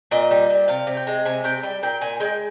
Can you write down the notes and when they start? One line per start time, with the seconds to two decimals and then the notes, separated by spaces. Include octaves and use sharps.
0.11 A#2 D#5
0.31 G3
0.49 A#2
0.68 C3 F5
0.87 C3
0.97 G5
1.07 G#3
1.25 C3 G#5
1.44 C3 G5
1.63 G3 G5
1.83 A#2 G5
2.01 A#2 G#5
2.20 G#3 G5